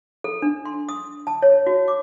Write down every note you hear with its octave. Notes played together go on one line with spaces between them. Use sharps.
A4
D4
C6
D#6
A5
C#5
F#4
D6